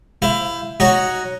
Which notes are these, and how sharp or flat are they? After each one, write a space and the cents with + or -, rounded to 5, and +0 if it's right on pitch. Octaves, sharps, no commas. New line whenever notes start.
E4 +20 C5 +0 F5 +0
D#4 +0 F#4 +0 C#5 +0